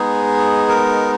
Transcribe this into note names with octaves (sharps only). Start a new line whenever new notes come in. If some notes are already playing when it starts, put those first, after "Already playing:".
Already playing: G#3 B3 D#4 G#4
A#4